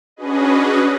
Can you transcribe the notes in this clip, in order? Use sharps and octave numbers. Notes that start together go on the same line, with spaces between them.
C#4 D4 F#4 G#4 B4 D#5